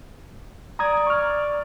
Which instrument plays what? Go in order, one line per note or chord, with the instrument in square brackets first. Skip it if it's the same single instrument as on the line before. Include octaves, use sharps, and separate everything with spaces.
[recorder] D5 [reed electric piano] A#5 D#6 G#6
[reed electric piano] C#6 F6